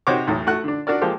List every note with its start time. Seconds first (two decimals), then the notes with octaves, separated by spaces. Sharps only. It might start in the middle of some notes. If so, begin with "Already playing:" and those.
0.07 C3 D#4 F#4 C5 C#5 D6
0.27 B1 E2 A2
0.47 A3 F#4 F#5 F#6
0.64 D3 D4
0.87 D4 F#4 A#4 D5
1.01 F3 G#3 A#3 G4 A4 C5